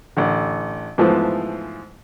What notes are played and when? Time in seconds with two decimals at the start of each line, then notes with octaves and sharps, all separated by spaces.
0.17 A1 D3
0.98 G#2 E3 F3 A3 B3